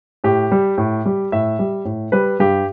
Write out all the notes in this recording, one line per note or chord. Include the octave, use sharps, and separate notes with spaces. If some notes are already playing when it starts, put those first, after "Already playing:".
A2 G4
G3
A2
G3
A2 E5
G3
A2
G3 B4
G2 G4